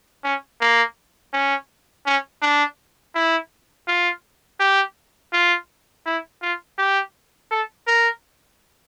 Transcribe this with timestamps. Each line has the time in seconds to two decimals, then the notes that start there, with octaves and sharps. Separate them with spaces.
0.24 C#4
0.61 A#3
1.33 C#4
2.06 C#4
2.42 D4
3.15 E4
3.87 F4
4.60 G4
5.33 F4
6.06 E4
6.42 F4
6.78 G4
7.51 A4
7.87 A#4